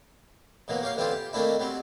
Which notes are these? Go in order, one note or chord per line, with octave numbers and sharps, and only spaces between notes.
B2 E3 F#3 A#3
A#3 G4 C#5 F5
D3 E3 C4 F4 G4
G4
D#3 A3 A#3 C4 D4 E4
F#3 G3 C4